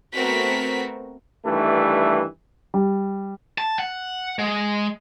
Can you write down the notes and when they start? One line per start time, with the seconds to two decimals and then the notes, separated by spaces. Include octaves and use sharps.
0.13 A3 B3 C4 F#4 A#4 B6
1.45 G2 D#3 E3 G3 A3
2.74 G3
3.58 A5
3.79 F#5
4.39 G#3